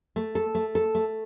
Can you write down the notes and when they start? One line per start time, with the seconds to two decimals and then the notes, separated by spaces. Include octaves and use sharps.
0.16 A3
0.35 A4
0.55 A3
0.75 A4
0.95 A3